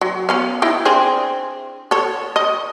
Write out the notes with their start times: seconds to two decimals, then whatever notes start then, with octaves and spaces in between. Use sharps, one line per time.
0.01 F#3
0.29 B3 C#4 F5
0.62 D#4 E4
0.85 C4 D4 G#4
1.91 A4 C#5
2.36 D#5